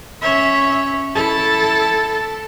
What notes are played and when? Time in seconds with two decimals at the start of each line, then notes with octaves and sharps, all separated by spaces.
0.22 C#4 C#5 E5
1.15 E4 A4 A5